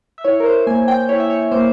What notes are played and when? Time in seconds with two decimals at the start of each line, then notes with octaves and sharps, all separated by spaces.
0.18 E5
0.25 E4 C#5
0.40 A#4
0.45 C5
0.67 A#3 G#5
0.88 G5
1.09 E4 C#5
1.20 E5
1.30 C#5
1.51 A#3 C5